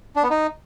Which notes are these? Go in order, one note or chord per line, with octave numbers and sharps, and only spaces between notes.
D4
B3
D#4